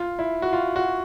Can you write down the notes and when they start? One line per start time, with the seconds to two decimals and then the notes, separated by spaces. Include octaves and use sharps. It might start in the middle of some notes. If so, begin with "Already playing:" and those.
Already playing: F4
0.19 E4
0.42 F#4
0.53 F4
0.76 F#4